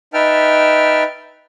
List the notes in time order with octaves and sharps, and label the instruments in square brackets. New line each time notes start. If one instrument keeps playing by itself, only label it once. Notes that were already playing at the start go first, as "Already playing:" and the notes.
[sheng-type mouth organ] D#4 B4 E5 G5 A5 F6